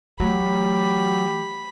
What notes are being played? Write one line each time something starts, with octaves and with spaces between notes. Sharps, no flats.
E3 F#3 A3 G4 B5